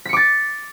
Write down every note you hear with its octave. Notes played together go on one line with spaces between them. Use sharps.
D6 A6 B6 C#7